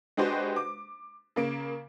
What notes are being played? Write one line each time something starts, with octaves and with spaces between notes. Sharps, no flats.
G#3 D4 F#4 G4 B4 C5
D6
C#3 A#3 D7